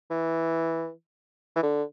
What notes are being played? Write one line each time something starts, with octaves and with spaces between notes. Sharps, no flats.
E3
E3
D3